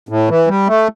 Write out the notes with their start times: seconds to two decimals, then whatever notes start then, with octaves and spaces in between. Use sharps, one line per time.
0.09 A2
0.29 E3
0.47 G3
0.67 A3